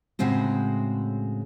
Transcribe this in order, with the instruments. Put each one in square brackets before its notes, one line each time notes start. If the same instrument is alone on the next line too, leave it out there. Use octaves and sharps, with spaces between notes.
[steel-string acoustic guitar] A2 C#3 G#3 C4 F#4